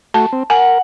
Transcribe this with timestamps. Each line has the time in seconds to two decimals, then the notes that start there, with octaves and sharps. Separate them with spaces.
0.14 A3 F#4 A5
0.33 C4
0.50 A#4 F#5 G#5